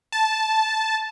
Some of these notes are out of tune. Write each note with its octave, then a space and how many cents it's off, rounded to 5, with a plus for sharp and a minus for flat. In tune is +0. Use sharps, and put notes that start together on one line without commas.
A5 -10